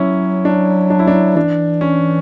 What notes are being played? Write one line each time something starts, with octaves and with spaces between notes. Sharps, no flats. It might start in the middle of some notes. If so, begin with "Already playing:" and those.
Already playing: F#3 C#4 E4
D4
D4
E4
D4
E3 D4
C#4